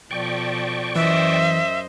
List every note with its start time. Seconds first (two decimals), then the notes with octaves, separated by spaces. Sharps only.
0.11 B2 F3 A4 D5 G5 C#6
0.96 F#2 E3 C5 D#5 E5